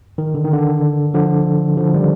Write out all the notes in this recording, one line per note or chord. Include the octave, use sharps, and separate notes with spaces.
D#3
D3
D#3
D3
D3 F3
D3 F3
D#3 G3